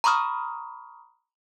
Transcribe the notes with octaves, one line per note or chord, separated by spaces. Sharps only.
A#5 B5 C#6 D#6 F6